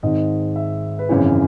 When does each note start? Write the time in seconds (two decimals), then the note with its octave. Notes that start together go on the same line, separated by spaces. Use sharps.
0.03 G#1 G#2 D#3 D#5
0.56 E5
0.99 B4
1.09 G#1 F#2 C#3 E3 C#5